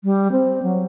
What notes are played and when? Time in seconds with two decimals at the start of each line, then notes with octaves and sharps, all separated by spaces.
0.04 G3
0.32 C4
0.63 F#3